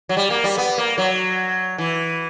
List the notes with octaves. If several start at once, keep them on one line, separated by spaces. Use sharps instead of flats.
F#3
G3
A#3
G3
B3
A#3
F#3
E3